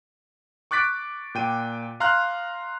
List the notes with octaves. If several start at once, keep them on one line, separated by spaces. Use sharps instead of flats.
C#6 D6 F#6 A6 B6 D7
A#2 G5 D#7
F5 A#5 C6 F6 F#6